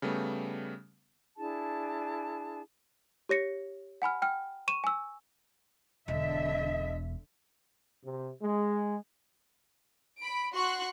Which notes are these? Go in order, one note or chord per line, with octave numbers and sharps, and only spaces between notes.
C#3 G3 A3 B3
D4 E4 G#4 A5
G4 C#5 A#6 C#7
F#5 G#5 B5 F6
G5 F6
C#6 D#7 E7
G#5 E6
E1 D3 D#5 E5
C3
G#3
B5 D7
F#4 C6 C#6 F#6